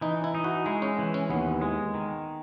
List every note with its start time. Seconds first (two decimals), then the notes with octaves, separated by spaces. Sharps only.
0.01 E3 D#4
0.24 E4
0.35 D#4
0.44 F#4
0.66 G#3 E4
0.82 C#4
0.99 E3
1.14 C#4
1.30 D#2 B3
1.62 G#3
1.94 D#3